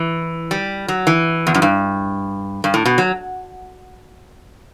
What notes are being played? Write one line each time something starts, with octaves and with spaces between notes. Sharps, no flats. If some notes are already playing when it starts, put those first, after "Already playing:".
Already playing: E3
G3
F#3
E3
E2
F#2
G2
G2
A2
B2
F#3